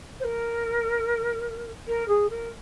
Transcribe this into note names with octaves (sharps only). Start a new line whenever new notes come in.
C5
A#4
A#4
G#4
A#4